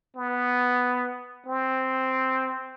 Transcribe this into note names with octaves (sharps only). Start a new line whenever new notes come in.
B3
C4